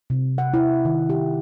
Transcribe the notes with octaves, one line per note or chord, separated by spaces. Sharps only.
C3
F#5
E4
D#3
G4